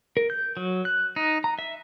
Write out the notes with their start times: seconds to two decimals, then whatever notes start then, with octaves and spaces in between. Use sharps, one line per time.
0.17 A#4
0.30 G6
0.57 F#3
0.85 F#6
1.16 D#4
1.44 A#5
1.59 E5